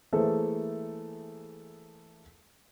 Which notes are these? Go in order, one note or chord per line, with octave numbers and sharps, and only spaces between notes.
E3 A3 A#3 G#4 A4 C5